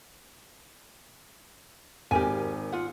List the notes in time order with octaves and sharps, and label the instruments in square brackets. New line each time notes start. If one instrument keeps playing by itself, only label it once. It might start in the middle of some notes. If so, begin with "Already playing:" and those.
[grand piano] G#1 [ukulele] G4 A#4 G#5
[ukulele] F4 F#5